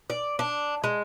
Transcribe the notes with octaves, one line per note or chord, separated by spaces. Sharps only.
D5
D4
G#3